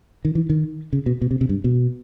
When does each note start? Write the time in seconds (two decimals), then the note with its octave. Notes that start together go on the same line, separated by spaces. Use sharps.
0.25 D#3
0.35 E3
0.50 D#3
0.93 C#3
1.06 B2
1.22 B2
1.31 C3
1.41 C3
1.49 G2
1.64 B2